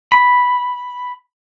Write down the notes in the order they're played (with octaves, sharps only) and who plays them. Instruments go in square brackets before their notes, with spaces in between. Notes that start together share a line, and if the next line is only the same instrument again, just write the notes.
[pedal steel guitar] B5